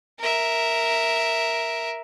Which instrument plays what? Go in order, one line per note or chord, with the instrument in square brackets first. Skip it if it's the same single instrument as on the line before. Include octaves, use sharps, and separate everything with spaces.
[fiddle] A#4 E5